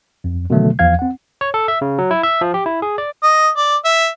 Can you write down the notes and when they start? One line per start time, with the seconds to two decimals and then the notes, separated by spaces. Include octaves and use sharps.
0.24 F2
0.50 B2 D3 D#3 F3 F#3 A3
0.79 E2 F3 F5 G#6
0.99 C4 F#5
1.41 C#5
1.54 A4
1.68 E5
1.81 C#3
1.98 F#3
2.11 E4
2.23 E5
2.41 F3
2.54 G4
2.66 E4
2.82 G#4
2.98 D5
3.23 D#5
3.57 D5
3.85 E5